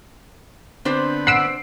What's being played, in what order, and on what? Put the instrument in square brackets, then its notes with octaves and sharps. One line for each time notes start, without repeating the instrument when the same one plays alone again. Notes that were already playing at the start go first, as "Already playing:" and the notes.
[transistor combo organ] D3 B3 B4 [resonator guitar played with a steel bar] C4 D4 C5
[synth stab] F#5 B5 E6 [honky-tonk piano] C7 D7